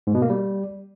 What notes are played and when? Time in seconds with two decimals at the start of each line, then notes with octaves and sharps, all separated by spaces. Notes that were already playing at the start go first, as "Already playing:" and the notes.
0.07 G#2
0.15 B2
0.22 A#3
0.30 G3